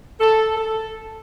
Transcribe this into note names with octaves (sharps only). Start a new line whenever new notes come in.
A4
A4